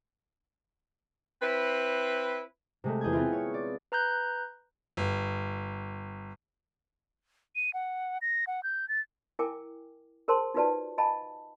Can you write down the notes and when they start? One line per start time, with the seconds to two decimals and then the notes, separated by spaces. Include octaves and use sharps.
1.42 C4 E4 B4
2.84 C3 G#3 A3
3.01 E2 G#4 G6 G#6
3.13 B3 C4 E4 F4
3.33 C#5
3.54 D5
3.92 B4 A#5 F#6 G6
4.97 G1
7.56 D#7
7.74 F#5
8.22 A#6
8.47 F#5
8.63 G6
8.89 A6
9.39 E4 A#4 G5 G#5 D6
10.28 G#4 A#4 C5 A5 C6
10.54 D#4 F4 F#4 B4 D5 A5
10.98 D#5 F5 G#5 A5 B5